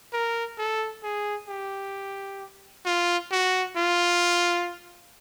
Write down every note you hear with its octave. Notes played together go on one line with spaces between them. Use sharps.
A#4
A4
G#4
G4
F4
F#4
F4